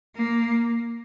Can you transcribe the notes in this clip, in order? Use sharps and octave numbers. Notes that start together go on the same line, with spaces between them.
A#3